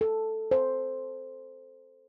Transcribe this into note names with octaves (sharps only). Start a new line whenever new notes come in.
A4
C5